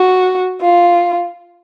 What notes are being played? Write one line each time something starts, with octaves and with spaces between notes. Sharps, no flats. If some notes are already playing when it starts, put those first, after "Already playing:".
Already playing: F#4
F4